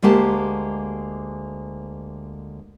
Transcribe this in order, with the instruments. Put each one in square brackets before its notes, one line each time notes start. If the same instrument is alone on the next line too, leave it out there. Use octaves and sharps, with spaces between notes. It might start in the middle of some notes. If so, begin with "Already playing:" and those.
[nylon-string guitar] D2 G#3 A#3 G4 A5